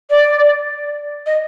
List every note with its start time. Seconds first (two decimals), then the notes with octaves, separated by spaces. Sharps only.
0.10 D5
1.26 D#5